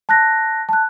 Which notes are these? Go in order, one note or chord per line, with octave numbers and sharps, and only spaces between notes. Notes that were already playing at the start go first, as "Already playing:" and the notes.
A5 F#6 A#6
A5 F#6